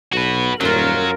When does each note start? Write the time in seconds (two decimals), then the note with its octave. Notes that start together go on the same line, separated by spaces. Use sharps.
0.13 B1 F#4 B4
0.61 D#1 F#2 F#3 F4 A#4